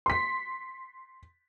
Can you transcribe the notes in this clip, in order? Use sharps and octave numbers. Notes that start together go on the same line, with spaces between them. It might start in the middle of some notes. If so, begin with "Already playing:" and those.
C6 B6